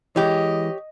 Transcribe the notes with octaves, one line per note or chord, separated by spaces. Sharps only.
E3 G#3 G4 C#5 D#5